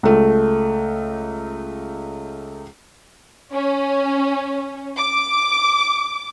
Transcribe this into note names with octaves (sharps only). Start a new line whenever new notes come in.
C#2 A3
C#4
D6